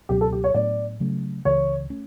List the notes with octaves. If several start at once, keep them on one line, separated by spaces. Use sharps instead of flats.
C#2 B2 F#3 C#4 G4
A4
G4
C#5
A2 F#3 B3 D4 D5
C#3 F#3 A3
C#2 C#3 E3 C#5
A3 C#4